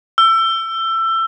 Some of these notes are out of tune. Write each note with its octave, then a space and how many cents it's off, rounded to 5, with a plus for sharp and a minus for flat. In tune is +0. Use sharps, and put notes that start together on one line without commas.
E6 +20